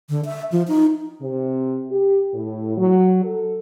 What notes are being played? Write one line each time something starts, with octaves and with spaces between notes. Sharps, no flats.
D3
E5
F3
D#4
C3
G4
A2
F#3
A4